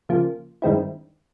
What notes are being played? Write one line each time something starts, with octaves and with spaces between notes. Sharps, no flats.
C#3 F3 A#3
G2 D#3 G#3 C4 E4